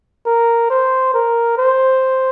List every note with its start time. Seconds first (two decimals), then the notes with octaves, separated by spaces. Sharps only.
0.26 A#4
0.70 C5
1.14 A#4
1.58 C5